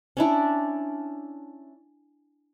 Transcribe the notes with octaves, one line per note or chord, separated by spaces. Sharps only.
C#4 D4 E4